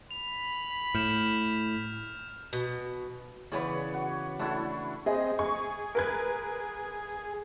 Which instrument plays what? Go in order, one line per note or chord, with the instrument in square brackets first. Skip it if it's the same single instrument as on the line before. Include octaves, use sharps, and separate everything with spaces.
[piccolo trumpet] B5 [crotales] F7
[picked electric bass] A2 [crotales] F6 G6 E7
[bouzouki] B2
[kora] C#3 E3 B3 [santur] B4 C#5 D5
[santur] F#4
[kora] A3 A4 [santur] D4 E4 F#4
[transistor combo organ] C4 [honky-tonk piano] G#4 D#5
[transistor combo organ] G#4 [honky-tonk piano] C#6
[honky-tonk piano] A#4 B4 G#6